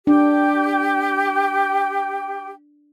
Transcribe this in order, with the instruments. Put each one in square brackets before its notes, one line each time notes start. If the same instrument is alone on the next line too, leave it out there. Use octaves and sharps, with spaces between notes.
[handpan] D4 [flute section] G4 G5